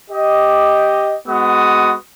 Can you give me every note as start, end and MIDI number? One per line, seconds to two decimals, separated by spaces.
0.10 1.16 67
0.10 1.16 75
1.28 1.94 56
1.28 1.94 59
1.28 1.94 66
1.28 1.94 87